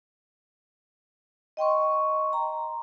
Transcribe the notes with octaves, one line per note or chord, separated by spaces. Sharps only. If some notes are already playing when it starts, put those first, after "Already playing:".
D#5 G5 C6 C#6
A#5